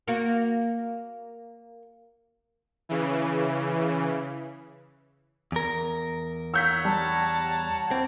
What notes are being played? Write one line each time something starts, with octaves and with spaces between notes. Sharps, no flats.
A#3 F#4 A#4
C#3 E3
E2 A#4
C#5 F#5 A#5 E6 G6 B6
G3 A5
A#3 C4 E4